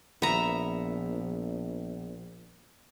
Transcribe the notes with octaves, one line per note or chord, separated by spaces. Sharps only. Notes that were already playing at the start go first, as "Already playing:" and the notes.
A#1 B3 E5 A#5